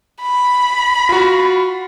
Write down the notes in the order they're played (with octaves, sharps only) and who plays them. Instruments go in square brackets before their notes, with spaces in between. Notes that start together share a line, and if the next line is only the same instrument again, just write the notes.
[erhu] B5
[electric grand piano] F4 F#4